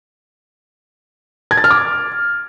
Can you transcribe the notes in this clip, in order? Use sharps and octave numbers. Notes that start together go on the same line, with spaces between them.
G#6
A6
F6
D6